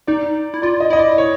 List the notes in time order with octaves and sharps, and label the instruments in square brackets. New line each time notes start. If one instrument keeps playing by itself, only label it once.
[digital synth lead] D#4 [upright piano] D5
[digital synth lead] E4
[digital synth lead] F4 [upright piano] D5
[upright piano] D#5
[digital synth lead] E4 [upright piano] D#5
[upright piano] D5
C#5